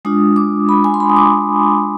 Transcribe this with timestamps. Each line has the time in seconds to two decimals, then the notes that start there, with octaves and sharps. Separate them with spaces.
0.05 G#3 D4 F4 D#6
0.36 D6
0.69 B5
0.84 G#5
0.94 C6
1.00 B5
1.09 D#6
1.16 D6